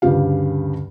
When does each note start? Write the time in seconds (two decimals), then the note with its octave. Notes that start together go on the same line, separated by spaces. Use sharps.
0.02 D2 G2 C#3 G4 F5